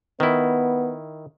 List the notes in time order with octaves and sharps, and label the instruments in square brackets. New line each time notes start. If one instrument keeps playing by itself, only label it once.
[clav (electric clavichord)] D#3 E4 [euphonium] B3